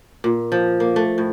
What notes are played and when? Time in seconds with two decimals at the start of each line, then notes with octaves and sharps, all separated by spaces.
0.24 A#2
0.52 F3
0.80 A#3
0.96 A3
1.18 A2